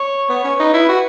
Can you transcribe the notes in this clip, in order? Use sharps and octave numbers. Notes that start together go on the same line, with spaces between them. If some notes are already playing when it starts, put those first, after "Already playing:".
Already playing: C#5
B3 C#5
C#4
D#4 B4
E4
F#4